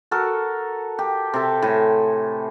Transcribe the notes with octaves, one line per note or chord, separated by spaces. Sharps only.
F#4 A4 A#4
G4
C3 A4
A2 G#5